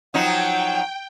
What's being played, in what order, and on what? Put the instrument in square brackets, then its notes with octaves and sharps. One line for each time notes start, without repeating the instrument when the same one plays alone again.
[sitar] F3 F#3 D#4 [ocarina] F#5 [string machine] G5